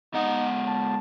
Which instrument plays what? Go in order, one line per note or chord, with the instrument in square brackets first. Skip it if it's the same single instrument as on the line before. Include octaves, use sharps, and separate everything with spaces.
[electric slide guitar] G#2 B3 F#5 [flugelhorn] D#4
[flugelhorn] A5